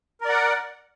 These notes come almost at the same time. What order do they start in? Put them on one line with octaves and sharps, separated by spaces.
A#4 D5 F#5